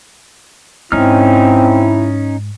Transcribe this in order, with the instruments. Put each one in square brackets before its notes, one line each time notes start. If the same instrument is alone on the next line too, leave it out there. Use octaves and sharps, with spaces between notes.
[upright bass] G#2 [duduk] C4 [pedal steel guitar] C#4 D#4 F6 [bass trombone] E4